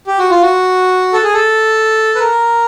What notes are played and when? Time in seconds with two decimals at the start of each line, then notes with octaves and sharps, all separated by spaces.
0.07 G4
0.19 F#4
0.30 F4
0.42 F#4
1.13 A4
1.24 G#4
1.34 A4
2.15 B4
2.20 A#4